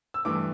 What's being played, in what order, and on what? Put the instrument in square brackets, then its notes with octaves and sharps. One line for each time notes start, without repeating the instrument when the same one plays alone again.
[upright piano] E6
G2 E3 A3 D6